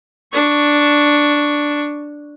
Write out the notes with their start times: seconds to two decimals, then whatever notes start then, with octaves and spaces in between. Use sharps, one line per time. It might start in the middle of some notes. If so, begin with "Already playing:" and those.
0.33 D4 C#6